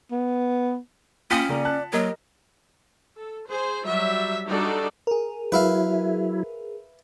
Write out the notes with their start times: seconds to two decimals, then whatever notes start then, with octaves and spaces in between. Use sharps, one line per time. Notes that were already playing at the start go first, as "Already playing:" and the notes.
0.11 B3
1.31 A#3 C#4 F4 G5 D#6 B6 C#7
1.49 C#3 A#3 A#4 D5
1.65 A5 F#6
1.93 F#3 A#3 G4 A#4 D#5
3.17 A4
3.47 G#4 C5
3.85 F#3 G3 E5
4.48 G3 D4 D#4 F#4 A4 D5
5.07 G#4 A#4
5.52 F#3 E4 B4 E5 F5